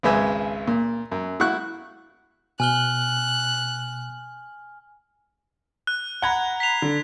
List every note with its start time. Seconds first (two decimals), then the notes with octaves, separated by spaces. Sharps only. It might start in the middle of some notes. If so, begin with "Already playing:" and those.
0.03 G#1 C#2 G#3 B4 E5 G#5
0.67 A#2
1.12 F#2
1.40 E4 F#4 C#6 F#6
2.60 B2 G#5 F6 F#6 G7
5.87 F#6
6.22 F#5 A#5 B5 F#6 G#6
6.60 B6 C7 F7
6.82 D3